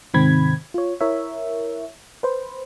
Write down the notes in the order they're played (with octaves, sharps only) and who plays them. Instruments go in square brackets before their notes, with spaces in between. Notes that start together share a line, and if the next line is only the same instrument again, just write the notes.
[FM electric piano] G#2 C3 D#3 C4 B5 G#6
F4 C#5
E4 A#4 C#5 E5
B4 C5